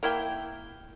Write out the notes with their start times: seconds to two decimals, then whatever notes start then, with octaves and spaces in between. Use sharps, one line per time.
0.03 A#3 E4 G5